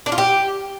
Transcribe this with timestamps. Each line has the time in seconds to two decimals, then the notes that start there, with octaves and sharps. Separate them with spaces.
0.06 D4
0.12 F4
0.18 G4